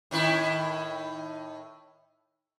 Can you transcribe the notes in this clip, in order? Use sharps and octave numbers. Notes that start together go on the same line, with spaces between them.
A2 D#3 E4